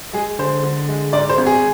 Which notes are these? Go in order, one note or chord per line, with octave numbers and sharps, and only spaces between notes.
G#3 G#4
D3 C5
D3
G#3
G#2 D5
C5
G#1
G#4